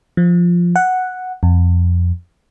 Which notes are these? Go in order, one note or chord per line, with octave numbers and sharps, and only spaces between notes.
F3
F#5
F2